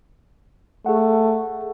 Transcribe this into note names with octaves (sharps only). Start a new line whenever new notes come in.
A3 G#4 F#5